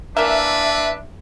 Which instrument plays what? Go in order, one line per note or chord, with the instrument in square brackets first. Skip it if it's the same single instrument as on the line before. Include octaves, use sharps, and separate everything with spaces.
[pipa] E3 A#3 [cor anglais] D4 [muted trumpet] B4 [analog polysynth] E5